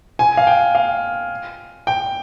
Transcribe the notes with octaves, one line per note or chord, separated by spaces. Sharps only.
G#5
F5
G5
F5
G5